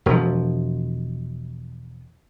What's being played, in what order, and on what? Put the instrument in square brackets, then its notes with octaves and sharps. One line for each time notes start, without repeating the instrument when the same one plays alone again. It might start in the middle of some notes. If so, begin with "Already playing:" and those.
[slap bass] E1 F3